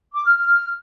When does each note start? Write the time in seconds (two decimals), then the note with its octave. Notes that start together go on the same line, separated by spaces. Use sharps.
0.14 D6
0.25 F6
0.36 F6